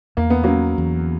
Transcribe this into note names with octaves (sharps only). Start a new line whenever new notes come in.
E2 A#3
B3
F#3 A#3 C#4
E2